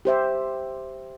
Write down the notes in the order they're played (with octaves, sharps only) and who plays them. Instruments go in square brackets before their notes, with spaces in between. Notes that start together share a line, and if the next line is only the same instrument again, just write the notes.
[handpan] G4 C5 E5